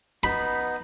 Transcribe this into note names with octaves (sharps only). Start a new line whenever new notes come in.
B3 D#4 B5